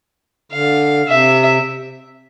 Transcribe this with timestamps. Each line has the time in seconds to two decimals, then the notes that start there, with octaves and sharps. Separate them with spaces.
0.52 D3 F5
1.08 C3 E5